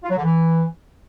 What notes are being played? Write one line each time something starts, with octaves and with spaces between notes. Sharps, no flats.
F4
F#3
D3
E3